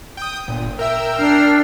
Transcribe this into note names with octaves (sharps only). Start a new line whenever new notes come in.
G5 D#6
G1 A#2
A#4 E5 G5 E6
D4 F6 C7